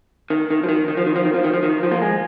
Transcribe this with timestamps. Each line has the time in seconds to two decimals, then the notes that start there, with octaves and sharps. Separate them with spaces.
0.30 D#3
0.50 D#3
0.63 F3
0.69 D#3
0.88 D#3
0.97 F3
1.06 D#3
1.16 F3
1.25 D#3
1.34 F3
1.44 D#3
1.54 F3
1.63 D#3
1.83 F3
1.92 A#3
2.02 G#3